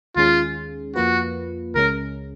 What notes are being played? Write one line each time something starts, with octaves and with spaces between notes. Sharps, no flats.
D#2 D#3 G#3 C#4 F4 G#4
F2 F3 A#3 F4 F#4 B4
C#2 C#3 G#3 C#4 A#4